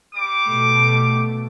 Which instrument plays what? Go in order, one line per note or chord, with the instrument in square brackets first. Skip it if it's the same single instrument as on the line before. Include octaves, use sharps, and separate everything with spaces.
[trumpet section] G3 D6
[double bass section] B2 A3